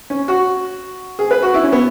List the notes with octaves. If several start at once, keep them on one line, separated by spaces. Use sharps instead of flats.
C#4
F#4
G#4
B4
F#4
E4
C#4
B3